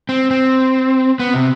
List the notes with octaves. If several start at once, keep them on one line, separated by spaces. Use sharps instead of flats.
C4
C4
B3
C3